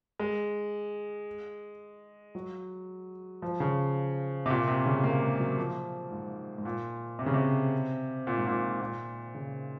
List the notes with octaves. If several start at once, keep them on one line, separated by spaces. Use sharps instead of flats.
G#3
F#3
F3
C#3
C3
A#2
C3
C#3
A#3
G#3
F#3
F3
G#2
G#2
A#2
C3
C#3
C3
A#2
G#2
A#2
A#2
C#3